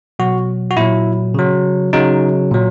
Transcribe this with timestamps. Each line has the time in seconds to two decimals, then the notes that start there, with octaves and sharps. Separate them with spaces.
0.19 B2 F#3 F#4
0.71 F#4
0.77 A#2 F#3 E4
1.34 C#3 F#3
1.93 C#3 F#3 D#4
2.51 A#2 F#3